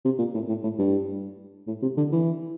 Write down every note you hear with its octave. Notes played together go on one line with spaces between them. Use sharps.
C3
A#2
A2
A2
A2
G2
A2
C3
D3
E3